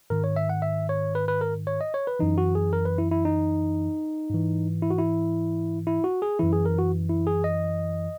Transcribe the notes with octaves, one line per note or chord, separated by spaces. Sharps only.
G#2 D#3 A#4
C#5
E5
F#5
E5
C#5
B4
B4
A#4
C#5
D#5
C#5
B4
F#2 E3 D#4
F#4
G#4
A#4
B4
E4
E4
D#4
G#2 E3
E4
F#4
E4
E4
F#4
G#4
F#2 E3 E4
G#4
A#4
F#4
E4
G#4
D#5